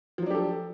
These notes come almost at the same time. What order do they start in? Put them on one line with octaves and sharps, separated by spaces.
F3 F#3 D4 G4 A4